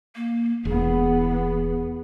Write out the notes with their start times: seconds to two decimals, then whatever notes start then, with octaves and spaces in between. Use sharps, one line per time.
0.16 A#3
0.65 E1 E3 B3 G#4